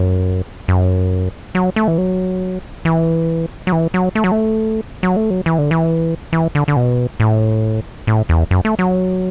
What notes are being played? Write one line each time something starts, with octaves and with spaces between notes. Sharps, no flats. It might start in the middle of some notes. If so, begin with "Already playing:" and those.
Already playing: F#2
F#2
F#3
A3
E3
F#3
E3
F#3
E3
F#3
A3
F#3
A3
F#3
A3
F#3
E3
D3
E3
E3
D3
D3
B2
A2
A2
E2
F#2
A3
F#3